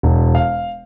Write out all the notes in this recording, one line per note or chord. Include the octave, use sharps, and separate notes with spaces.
E1
F5